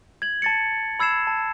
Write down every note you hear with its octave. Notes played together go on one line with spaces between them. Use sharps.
G#6 F#7
A5 A6 C#7
B5 E6 G#6 C7 E7
A5